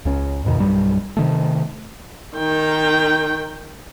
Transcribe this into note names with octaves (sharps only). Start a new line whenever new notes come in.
C#2 C#4
E2 G#2 B2 D#3
B1 G2 G3
C3 D#3 A3
D#3 G5